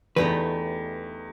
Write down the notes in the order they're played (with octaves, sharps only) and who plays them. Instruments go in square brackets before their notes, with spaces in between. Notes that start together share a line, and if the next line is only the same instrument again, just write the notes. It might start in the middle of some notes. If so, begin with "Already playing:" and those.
[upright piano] E2 [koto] D3 A3 D#4 [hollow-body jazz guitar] G4 B4